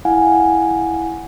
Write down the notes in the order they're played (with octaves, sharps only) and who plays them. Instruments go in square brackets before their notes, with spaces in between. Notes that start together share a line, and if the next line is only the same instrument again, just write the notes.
[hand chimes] E4 F5 F#5 G#5